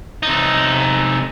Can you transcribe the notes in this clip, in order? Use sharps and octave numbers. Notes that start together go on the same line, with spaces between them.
C3 D#4